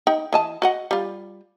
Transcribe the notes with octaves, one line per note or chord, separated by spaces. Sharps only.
D#4 G5
E3 D#5 A5
F#4 D#5 F#5
G3 F4